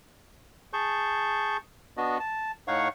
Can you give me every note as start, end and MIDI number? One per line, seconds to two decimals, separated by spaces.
0.73 1.57 68
0.73 1.57 81
0.73 1.57 85
0.73 1.57 91
1.97 2.18 59
1.97 2.18 62
1.97 2.18 66
1.97 2.18 75
2.20 2.51 81
2.68 2.88 45
2.68 2.88 63
2.68 2.88 73
2.68 2.88 77
2.68 2.88 78
2.68 2.88 85